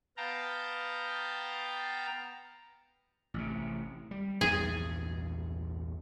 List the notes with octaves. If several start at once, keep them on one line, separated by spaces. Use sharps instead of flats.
B3 F5 G5 A5 A#5
A1 C3
G3
A#1 E2 G2 G#4